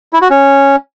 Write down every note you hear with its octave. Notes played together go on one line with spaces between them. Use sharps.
E4
F#4
C#4